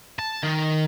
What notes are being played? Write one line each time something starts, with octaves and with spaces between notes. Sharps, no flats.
A5
D#3